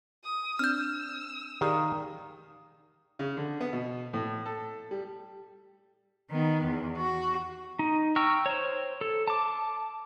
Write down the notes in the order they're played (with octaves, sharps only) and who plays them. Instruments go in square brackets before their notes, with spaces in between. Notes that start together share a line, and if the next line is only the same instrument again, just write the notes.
[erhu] D#6
[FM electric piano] C4 D4 [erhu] E6 [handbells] F6 G6
[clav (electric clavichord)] D#3 F5 [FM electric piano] G4 G#4 D5
[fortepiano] C#3
D3
B3
B2
A2
A4
G3
[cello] D#3 B3
E2
F#4
[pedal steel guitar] D#4
G5 A#5 C#6 E6 F6
C5 C#5
A4
A5 D6